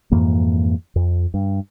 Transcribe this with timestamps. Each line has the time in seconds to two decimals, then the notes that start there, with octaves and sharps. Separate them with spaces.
0.12 F2 G#2 E3 A#3
0.96 F2
1.34 G2